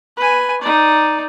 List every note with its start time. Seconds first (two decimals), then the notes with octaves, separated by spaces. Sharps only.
0.17 B4 G#5
0.62 D#4 D5